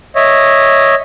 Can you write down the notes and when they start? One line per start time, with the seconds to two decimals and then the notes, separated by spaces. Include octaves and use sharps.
0.16 C#5 D#5 E5